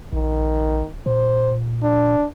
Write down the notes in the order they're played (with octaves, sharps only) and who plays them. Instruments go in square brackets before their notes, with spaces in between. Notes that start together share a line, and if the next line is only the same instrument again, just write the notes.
[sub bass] A#1 [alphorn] D#3
[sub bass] A#2 [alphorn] C5
[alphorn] D4